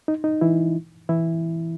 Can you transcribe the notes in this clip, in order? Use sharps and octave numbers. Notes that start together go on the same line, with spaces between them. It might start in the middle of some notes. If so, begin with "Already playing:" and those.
D#4
D#4
E3 E4
E3 E4